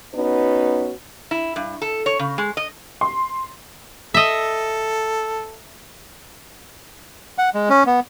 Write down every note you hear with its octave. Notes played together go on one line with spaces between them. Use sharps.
B3 C#4 D#4 F#4 B4
E4
G2
A4
C#5
C#3
G#3
D#5
C6
A4 D#5 E5
F#5
G#3
C#4
B3